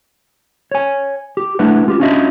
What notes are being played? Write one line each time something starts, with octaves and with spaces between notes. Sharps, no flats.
C#5 G#5
G4
G#3 A3 D4 E4 B4 F#5
C#4 F4 G4
C#4 D4 F4 F#4 D#5 E5